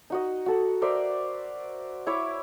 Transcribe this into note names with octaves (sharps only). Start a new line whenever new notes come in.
D#4 F#4 D#5
F#4 A4
A#4 C5 D5 E5
E4 C#5 E5 D6